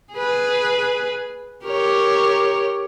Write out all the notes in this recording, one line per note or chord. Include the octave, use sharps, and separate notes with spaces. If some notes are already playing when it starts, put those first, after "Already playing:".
G#4 B4
G4 A#4 C#5